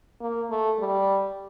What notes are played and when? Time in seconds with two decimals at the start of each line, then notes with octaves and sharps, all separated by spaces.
0.21 A#3
0.50 A3
0.80 G3